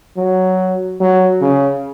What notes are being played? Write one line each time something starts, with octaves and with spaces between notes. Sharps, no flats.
F#3
F#3
C#3